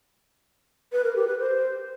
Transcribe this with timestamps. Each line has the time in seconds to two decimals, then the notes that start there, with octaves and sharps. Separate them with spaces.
0.92 B4
1.04 A#4
1.16 G4
1.27 B4
1.39 C5